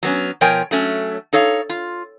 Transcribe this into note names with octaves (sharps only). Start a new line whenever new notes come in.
F#3 B3 C#4
B2 F3 A#4 C#5 G5 G#5
F#3 A3 C#4
D#4 A4 C#5 F5
F4